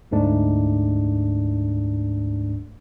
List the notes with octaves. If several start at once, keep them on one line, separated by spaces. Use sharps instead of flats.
D2 G#2 A3 D4